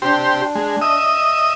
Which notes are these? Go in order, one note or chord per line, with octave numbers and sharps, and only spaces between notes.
D4 G4 C5
G#3
D#5 E5 D#6